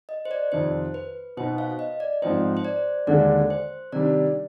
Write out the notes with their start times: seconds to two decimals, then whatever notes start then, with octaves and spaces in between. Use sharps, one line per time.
0.09 D#5
0.25 C5
0.31 D5
0.52 F2 C3 D#3 C5
0.94 B4
1.37 B2 B3 D#4 C5
1.58 F5
1.79 D#5
2.00 D5
2.22 G#2 F3 C4 D#4 C5
2.57 C5
2.65 D5
3.07 D#2 D3 G#3 D4 D5
3.50 C5
3.92 C3 D#3 G3 D4 D5